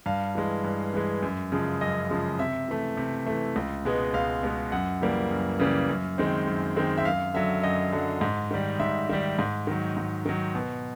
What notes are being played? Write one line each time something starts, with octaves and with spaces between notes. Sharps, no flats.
G2 F5
E3 G#3
G2
E3 G#3
F#2
C#3 F3 G#3
F#2 D#5
C#3 F3 G#3
C3 E5
E3 A3
C3
E3 A3
C#2
B2 G#3 B3
C#2 F5
B2 G#3 B3
F#2 F#5
C#3 E3 G3 A#3
F#2
C#3 E3 G3 A#3
F#2
D#3 G#3 C4
F#2
D#3 G#3 C4
E5
F#2 F5
D3 F#3 E5
F#2 D#5
D3 F#3
G#2
D#3 G3
G#2 E5
D#3 G3 E5
G#2
D#3 F#3
G#2
D#3 F#3
B2